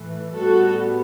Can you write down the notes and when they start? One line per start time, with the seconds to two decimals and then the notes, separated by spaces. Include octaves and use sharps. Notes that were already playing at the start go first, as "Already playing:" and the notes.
Already playing: A2 E3 A3
0.35 A2 G3 B3 F#4 A4